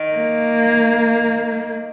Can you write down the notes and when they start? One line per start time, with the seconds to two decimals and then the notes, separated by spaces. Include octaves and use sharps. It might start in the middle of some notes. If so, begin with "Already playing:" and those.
Already playing: D#3
0.14 A#3